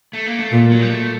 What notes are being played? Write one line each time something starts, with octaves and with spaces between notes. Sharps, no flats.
A3
A#3
A3
A#2
F#3
G3
A3